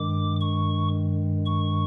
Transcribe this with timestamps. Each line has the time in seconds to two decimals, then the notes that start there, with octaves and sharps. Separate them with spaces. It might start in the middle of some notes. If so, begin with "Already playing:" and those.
Already playing: G2 D#3 G#3 D6
0.41 C#6
1.46 C#6